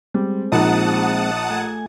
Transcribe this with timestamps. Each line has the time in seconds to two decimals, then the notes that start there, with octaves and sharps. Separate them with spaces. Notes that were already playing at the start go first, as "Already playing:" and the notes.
0.14 G3 G#3 C4
0.52 A#1 A#2 D#4 F#5 A5 D#6
1.50 A3 G#5